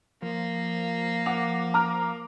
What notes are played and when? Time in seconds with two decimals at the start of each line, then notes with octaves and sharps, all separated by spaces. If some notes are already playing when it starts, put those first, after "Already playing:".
0.22 F3 A#3
1.26 F#5 D6 F7
1.74 A#5 D6 F6